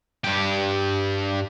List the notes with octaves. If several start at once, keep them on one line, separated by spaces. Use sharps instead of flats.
G2 G4